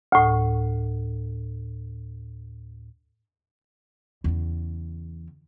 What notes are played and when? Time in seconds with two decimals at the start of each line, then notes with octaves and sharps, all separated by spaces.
0.12 D2 A2
4.24 E2 C#3